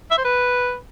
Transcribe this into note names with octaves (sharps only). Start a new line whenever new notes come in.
E5
C5
B4